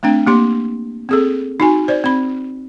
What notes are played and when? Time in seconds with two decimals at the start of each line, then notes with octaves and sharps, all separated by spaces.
0.03 A3 C4 D4 G5
0.27 A#3 G4 C6
1.09 C4 G#4 A4
1.60 D#4 F#4 G#5
1.88 C5 D5
2.04 C4 B5